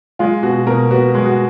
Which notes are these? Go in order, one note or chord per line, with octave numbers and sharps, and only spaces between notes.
G#3 F4
B2 F#4
B2 A#4
B3 F#4
G#3
F#4